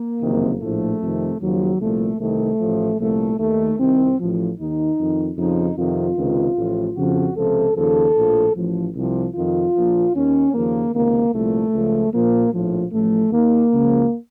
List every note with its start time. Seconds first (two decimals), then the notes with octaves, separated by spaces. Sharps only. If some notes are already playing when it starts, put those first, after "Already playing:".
Already playing: A#3
0.22 F#1 F2 C3 D#3
0.62 A#1 A2 F3 A3
1.02 F2 C3 D#3
1.41 D#2 C#3 F3 F#3
1.81 C2 A#2 F3 A3
2.21 C2 C3 D#3 A3
2.60 A1 A2 F3
3.00 C2 A#2 F3 A3
3.40 D#2 D#3 A3
3.80 C2 C3 D#3 C4
4.20 A1 A2 F3
4.59 D#2 D#3 D#4
4.99 F2 D#3
5.38 F2 C#3 F3 D#4
5.78 F2 C3 D#3 F4
6.17 C#2 C3 D#3
6.57 A1 A2 F3
6.97 F2 C#3 F3 F#4
7.37 C#2 C3 F3 A4
7.76 D#2 C#3 F3 A4
8.16 A#1 A2 F3
8.56 A1 A2 F3
8.96 C2 C3 F3
9.35 F2 C3 D#3 F4
9.75 A#1 A#2 F3
10.15 D#2 D#3 C#4
10.54 D#2 C#3 F3 A#3
10.94 C#2 C3 D#3 A#3
11.34 C2 A#2 F3 A3
11.73 C#2 C#3 F3
12.13 A#1 A#2 F3 A#3
12.53 A#1 A2 F3
12.92 A1 A2 F3 A3
13.32 D#2 D#3 A#3
13.72 C#2 C#3 F3